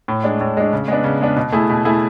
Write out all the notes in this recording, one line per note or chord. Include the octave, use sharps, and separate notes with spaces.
A2
G#3 D4
A2
G#3 D4
C#3
G#3 B3 D4
C#3
G#3 B3 D4
B2
A3 E4 G#4
B2
A3 E4 G#4